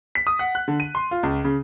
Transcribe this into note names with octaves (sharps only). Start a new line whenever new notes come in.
B6
D#6
F#5
F#6
D3
D#7
C6
F4
C#2
C#3